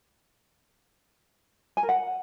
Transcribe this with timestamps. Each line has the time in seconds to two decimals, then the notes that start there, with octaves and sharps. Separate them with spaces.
1.77 G#5
1.83 A#4
1.89 F#5